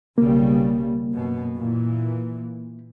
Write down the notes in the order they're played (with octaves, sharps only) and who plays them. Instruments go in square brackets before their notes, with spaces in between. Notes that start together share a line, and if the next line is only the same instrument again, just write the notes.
[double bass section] B1 C#3 G3 [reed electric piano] A#3
[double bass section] F#2 B2
A#2 E3